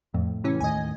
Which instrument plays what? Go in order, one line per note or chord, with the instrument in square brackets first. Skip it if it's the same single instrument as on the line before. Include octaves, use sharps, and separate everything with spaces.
[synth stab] F2 [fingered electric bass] A2
[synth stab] C3 E3 C#4
[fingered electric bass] D#2 A2 [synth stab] D#5 G#5